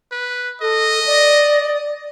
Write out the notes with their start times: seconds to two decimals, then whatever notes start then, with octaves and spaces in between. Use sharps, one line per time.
0.12 B4
0.62 A4 D#5
1.06 D5